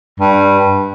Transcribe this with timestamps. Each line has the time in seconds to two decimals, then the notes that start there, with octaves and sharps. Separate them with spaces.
0.19 G2